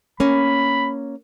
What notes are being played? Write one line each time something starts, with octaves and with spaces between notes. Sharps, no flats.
A#3 C#4 B5